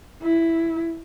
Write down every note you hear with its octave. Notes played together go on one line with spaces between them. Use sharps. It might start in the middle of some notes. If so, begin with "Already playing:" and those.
E4